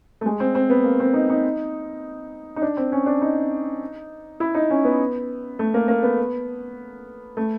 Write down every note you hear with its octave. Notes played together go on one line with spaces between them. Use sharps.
A3
G#3
C4
C4
B3
A#3
C4
D#4
D#4
D#4
D4
C4
C#4
D4
D#4
E4
D#4
C#4
B3
A3
A#3
A#3
B3
A3